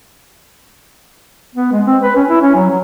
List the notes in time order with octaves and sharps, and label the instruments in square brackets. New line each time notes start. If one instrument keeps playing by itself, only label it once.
[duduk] B3
G#3
C4
B4
C#4
E4
C#4
F#3
F#3